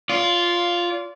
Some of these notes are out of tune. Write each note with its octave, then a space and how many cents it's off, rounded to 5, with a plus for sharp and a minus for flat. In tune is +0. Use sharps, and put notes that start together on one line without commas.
F4 +0 D5 -35